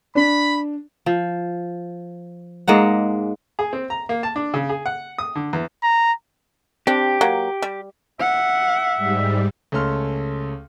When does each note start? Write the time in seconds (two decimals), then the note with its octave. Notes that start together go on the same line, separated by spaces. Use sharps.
0.15 D4 B5
1.06 F3
2.68 G#2 G#3 A#3 F#5
3.59 G#4
3.73 C4
3.90 A#5
4.09 A#3
4.23 A5
4.36 D4
4.54 C#3
4.69 G#4
4.86 F#5
5.18 D#6
5.35 D3
5.53 E2
5.83 A#5
6.87 C4 D4 G4
7.21 F#3 A#3
7.62 G3
8.20 E5 F#5
8.97 G#2 G3
9.72 C#2 A3 C#4 A4 C6 F6